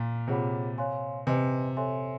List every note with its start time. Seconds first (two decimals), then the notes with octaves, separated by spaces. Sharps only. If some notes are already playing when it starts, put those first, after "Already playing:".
Already playing: A#2
0.28 C3 F4 G#4 C#5 F#5 B5
0.78 C#5 F5 G#5 C6
1.27 C3 B4 D#5 G#5 C6
1.77 A4 C#5 E5 G#5 C6